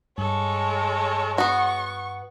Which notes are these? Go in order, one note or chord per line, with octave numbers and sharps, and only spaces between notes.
G2 G#3 A4 C#5
B3 F#4 C#6